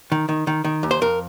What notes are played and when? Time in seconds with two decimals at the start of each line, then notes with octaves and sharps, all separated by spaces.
0.12 D#3
0.29 D#3
0.47 D#3
0.64 D#3
0.83 D#2
0.91 C5
1.01 F2 A#4